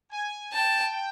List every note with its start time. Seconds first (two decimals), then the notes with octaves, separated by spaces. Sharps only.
0.10 G#5
0.53 G5 A5